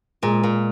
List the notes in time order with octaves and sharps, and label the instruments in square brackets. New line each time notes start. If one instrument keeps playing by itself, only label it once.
[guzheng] A#2 [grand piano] G#3 G#4
[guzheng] A#2